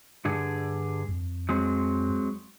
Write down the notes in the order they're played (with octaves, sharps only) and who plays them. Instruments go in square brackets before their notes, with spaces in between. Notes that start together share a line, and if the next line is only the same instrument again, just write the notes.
[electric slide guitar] G2 D3 G#4
[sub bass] F2
[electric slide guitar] F#3 G#3 C4